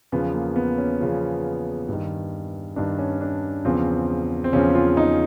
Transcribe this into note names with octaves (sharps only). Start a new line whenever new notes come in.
E2 C#3 F3 B3
A#3
B3
C#4
E2 C#3 F3
G2 D#3
G2 D#3 D4
C#4
D4
E2 C#3 F3 C4
C4
E2 C#3 F3 C#4
F4
D#4